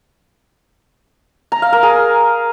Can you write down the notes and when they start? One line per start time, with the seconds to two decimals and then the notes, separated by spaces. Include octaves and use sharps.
1.52 A#5
1.62 F5
1.73 A#4
1.83 G#4